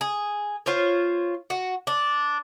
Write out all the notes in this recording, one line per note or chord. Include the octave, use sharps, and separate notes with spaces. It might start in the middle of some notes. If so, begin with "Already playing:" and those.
G#4
F4 C5 C#5
F#4
D4